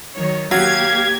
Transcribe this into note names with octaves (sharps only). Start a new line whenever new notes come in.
D#3 F#3 C#5
F#3 A#3 F#4 G4 F5 G#6